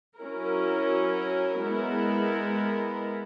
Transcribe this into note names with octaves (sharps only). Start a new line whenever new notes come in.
F#3 C#4 E4 A#4
G#3 B3 E4 A#4